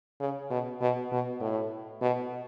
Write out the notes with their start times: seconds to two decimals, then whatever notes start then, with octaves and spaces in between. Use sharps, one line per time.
0.20 C#3
0.50 B2
0.81 B2
1.12 B2
1.41 A2
2.02 B2